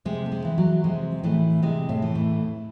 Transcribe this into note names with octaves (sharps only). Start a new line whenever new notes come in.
C3 G#3
A3
G#3
E3
F#3
C3 G#3
A2 E3 A3
C3 G#3
A2 A3
E3
A2 A3